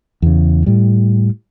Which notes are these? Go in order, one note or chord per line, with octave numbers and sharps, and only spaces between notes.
E2 C#3
A2 G3